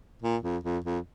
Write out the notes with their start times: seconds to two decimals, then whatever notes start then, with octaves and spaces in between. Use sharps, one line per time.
0.22 A#2
0.43 F2
0.64 F2
0.85 F2